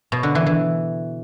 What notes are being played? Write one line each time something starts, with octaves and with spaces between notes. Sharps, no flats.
B2
D3
E3
E3